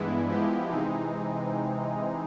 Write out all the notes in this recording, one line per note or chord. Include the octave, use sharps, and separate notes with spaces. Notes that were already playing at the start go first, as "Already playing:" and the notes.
Already playing: G2 E3 G#3 B3 E4
F3 G#3 B3 E4 G4
C3 E3 G#3 C4 D#4